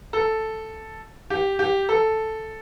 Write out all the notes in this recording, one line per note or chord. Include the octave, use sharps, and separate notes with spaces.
A4
G4
G4
A4